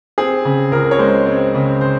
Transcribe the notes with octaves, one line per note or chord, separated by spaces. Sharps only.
C4 G#4
C#3
C#2 A#4
C#5
G#3 C5
C4
C#3
C5